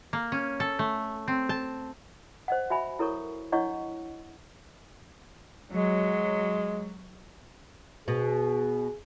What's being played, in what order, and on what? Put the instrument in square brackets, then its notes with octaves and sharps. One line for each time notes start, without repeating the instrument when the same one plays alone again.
[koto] A#3
C#4
A4
A3
C4
A5
[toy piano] C5 D#5 F#5
F#4 E5 G#5 B5
E4 A4 A#4 C#5 C#6
D4 E4 C#5 D#5 F#5 C#6
[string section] F#3 [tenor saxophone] G#3
[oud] B2 [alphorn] G#4